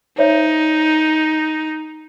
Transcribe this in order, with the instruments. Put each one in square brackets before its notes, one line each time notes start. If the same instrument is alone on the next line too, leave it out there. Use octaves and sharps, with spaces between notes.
[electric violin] D#4 [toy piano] C5 C#5 E5